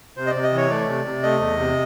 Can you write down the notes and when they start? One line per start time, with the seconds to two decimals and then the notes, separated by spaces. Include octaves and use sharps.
0.17 C3 C5
0.26 D#5
0.30 D5
0.35 C3
0.43 D#5
0.53 E3 C#5
0.70 A3 D5
0.88 C3
1.05 C3
1.23 A3 D#5
1.40 E2
1.58 C3